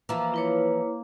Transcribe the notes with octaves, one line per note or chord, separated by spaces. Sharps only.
E3 F3 A#3
E4 B4 C#5